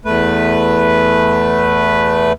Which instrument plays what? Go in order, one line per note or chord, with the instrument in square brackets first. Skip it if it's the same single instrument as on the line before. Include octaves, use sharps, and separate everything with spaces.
[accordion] E2 A3 B4